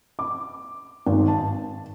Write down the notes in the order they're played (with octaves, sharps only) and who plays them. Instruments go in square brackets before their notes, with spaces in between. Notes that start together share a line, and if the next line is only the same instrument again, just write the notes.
[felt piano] D6
G#1
A5